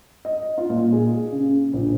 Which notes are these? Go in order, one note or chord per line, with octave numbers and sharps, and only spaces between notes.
D#5
F4
A#2
G#4
C#3
A#1